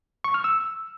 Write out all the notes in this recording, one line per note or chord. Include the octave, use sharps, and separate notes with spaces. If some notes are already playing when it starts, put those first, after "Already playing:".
C#6
F6
E6